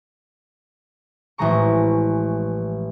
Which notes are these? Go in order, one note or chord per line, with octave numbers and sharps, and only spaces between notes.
A1 E3 F3 G#3 A#5 C#6